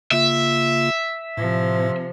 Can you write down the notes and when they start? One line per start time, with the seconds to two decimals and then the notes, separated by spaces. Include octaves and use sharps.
0.11 C#3 A#3 F4 E5
1.37 A2 C3 F3